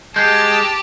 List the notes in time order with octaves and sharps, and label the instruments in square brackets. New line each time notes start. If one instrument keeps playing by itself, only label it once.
[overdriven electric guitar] G#3 [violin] G4 A5 [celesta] G6 C7